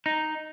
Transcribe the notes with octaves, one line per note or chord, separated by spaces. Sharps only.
D#4